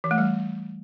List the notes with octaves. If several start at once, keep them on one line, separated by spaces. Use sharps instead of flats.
E3
A3
G3